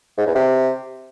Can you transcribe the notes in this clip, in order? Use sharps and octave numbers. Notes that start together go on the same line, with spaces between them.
G#2
E2
C3